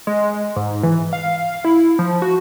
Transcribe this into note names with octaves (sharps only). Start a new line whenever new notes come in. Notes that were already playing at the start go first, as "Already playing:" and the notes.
G#3
G#2
E3
F5
E4
F3
F#4